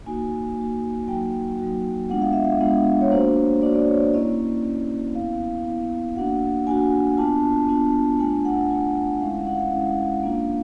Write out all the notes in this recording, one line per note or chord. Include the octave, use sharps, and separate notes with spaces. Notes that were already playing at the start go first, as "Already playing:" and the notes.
A#3 D#4 F#4 G#5
A#3 D#4 F#4
F#3 A#3 D#4 F#4 G5
F#3 A#3 D#4 F#4
G#3 B3 D4 F4 F#5
F5
E5
F5
G#3 B3 D4 F4
C#5
A#3 D4 F#4 C5
A#3 D4 F#4 D5
D5
C#5
D5
A#3 C#4 E4 D#5
A#3 C#4 E4
B3 E4 F5
B3 E4
A#3 D4 F#4 F#5
A#3 D4 F#4 G#5
B3 D4 F4 A5
B3 D4 F4
A3 D4 F4 G#5
F#5
A3 D4 F4
G#3 C#4 E4 F5
F#5
F#5
F5
F#5
G#3 C#4 E4 F5
A#3 D4 F4